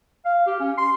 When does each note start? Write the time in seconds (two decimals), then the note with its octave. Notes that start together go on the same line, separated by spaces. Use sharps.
0.25 F5
0.47 G4
0.60 C#4
0.78 C6